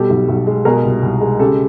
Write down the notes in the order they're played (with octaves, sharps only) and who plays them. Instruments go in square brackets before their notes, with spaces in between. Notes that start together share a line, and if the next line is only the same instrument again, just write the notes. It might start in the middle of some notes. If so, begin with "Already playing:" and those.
Already playing: [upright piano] B2 G3 G4 A4
B1
B1
G#3
B2 G#4 A#4
C2
C2
G#3
C#3 G4 A4